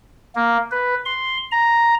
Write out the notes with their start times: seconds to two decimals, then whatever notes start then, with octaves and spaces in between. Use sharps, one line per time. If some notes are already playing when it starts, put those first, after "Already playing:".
0.35 A#3
0.71 B4
1.05 C6
1.52 A#5